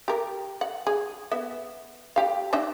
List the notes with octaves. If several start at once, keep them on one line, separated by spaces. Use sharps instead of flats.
G4 A#4
F#5
G#4
B3 E5
G4 F5
D4 D#4 E5